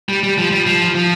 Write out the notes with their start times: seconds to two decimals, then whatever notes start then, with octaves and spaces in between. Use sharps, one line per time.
0.09 G3
0.23 G3
0.38 F3
0.51 G3
0.67 F3
0.95 F3